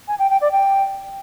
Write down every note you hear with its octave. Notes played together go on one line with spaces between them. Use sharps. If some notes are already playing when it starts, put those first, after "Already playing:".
G#5
G5
G5
D5
G5